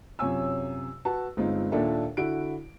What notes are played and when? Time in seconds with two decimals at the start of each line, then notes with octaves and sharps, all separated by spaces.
0.19 F#2 C3 F4 C#5 G#5 E6
1.05 F#4 B4 A5
1.37 G1 G#3 C4 D#4 F4
1.71 D#2 A#2 D4 A4 E5
2.17 D3 E4 F#4 D7